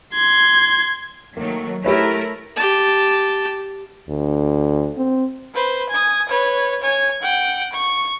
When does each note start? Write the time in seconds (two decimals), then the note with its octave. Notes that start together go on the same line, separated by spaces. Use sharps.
0.14 C6 G#6
1.37 D#3 F#3 A3 A#3
1.84 A3 E4 G4 A#4 B4 C#5
2.56 G4 A5
4.09 D2
4.97 C4
5.54 B4 C5
5.90 G#5 D#6
6.29 B4 C#5
6.82 C#5 G#5
7.22 F#5 G5
7.73 C#6